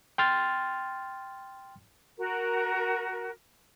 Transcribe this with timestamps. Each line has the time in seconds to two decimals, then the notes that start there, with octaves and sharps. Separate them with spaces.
0.18 G5 C6 F6 A6
2.17 F#4 A#4